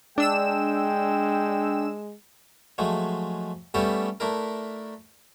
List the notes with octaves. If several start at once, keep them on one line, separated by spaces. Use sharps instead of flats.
G#3 D4 G5 E6 E7
F3 F#3 G#3 A3
G3 A3 B3 C#4 G4 A4
A3 D4 E4 A#4